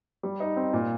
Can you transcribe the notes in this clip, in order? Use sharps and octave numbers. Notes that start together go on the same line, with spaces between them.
G3
D#4
C4
A#2